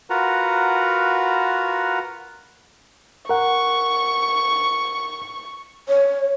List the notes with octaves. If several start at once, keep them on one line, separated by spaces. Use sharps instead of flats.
F4 F#4 A#4 B4 F#5 A#5
A#4 F#5 C#6
C#5